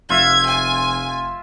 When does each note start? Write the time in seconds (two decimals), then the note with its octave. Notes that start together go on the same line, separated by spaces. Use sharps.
0.10 F1 F4 E5 G#6
0.47 G#5